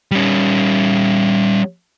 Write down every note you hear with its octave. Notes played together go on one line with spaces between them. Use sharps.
G3 C#4